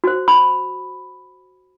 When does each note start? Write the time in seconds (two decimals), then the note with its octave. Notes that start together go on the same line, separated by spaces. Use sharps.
0.04 F#4 C5
0.28 B5